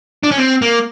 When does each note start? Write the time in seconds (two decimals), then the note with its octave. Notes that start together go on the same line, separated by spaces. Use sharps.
0.23 D4
0.31 C#4
0.38 C4
0.62 A#3